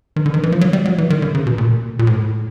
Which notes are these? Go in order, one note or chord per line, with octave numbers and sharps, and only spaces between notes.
D#3
D3
D#3
E3
F3
F#3
G3
F#3
E3
D#3
D3
C#3
B2
A#2
A#2
A2